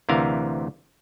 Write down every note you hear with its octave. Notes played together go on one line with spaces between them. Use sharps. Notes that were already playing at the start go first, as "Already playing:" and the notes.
D2 C3 E3 A#4 F5